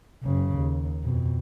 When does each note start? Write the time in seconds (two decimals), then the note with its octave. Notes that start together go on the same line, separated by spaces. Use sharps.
0.23 F#1 C#3
0.57 D#2
1.03 F2 B2